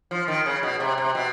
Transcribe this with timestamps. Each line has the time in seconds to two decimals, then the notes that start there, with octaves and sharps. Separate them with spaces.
0.11 F3
0.28 D#3
0.46 C#3
0.63 B2
0.80 C3
0.98 C3
1.15 B2